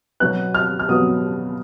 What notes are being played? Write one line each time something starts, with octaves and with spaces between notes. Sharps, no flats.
B2 F#3 B3 F#6
F6
F6
B2 F#3 B3 D#6